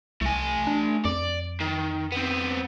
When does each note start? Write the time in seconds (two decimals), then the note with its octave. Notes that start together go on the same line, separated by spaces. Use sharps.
0.21 C2 A3 G#5
0.67 D4
1.05 F2 D5
1.60 D#3
2.12 B3 C4